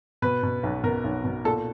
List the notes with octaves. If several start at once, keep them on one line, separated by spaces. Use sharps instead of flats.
B2 B4
B2
B1
B2 A#4
B1
B2
A#2 A4